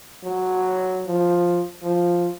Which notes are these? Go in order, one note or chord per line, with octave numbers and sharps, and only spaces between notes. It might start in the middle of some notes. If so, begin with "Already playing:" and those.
F#3
F3
F3